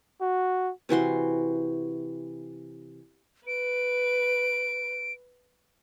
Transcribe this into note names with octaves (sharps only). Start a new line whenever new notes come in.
F#4
C3 E3 F#4 C6
B4 D7